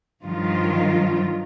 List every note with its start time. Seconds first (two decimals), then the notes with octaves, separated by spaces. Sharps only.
0.23 G2 D#3 F3 F#3 F4